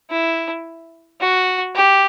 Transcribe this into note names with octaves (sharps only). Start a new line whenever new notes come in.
E4
F#4
G4